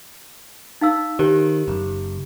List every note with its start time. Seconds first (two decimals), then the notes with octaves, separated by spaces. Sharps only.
0.81 D#4 F5 E6
1.19 D#3 G4 C5
1.68 F#1